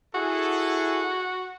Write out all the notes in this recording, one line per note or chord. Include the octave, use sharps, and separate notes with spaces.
E4 F#4 G#4 A4